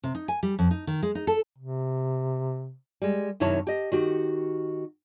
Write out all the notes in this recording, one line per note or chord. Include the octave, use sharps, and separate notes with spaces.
C3
D#4
G#5
G3
F2
D#4
D#3
G#3
D#4
A4
C3
G3 G#3
F#2 C3 D#3 E4 C#5 A5
G4 D#5
D#3 F#4 G4